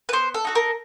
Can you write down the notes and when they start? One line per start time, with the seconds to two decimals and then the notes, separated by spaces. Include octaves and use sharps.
0.09 B4
0.12 B3 C5
0.34 A4
0.45 D#4 F#4 A4
0.55 A#4